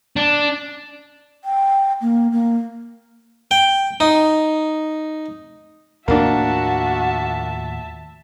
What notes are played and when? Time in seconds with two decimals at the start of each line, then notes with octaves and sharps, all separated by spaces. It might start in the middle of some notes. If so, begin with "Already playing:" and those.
0.17 D4
1.44 G5
2.01 A#3
2.32 A#3
3.51 G5
4.00 D#4
6.08 D#2 A2 F3 A#3 D4 F#4 E5 A5